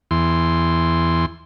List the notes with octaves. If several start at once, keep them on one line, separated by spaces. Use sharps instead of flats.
E2 C6